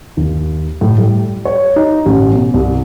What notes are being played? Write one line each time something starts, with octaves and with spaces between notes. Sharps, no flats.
D#2
A2
G3
C#5
D#4
A1
B2
C2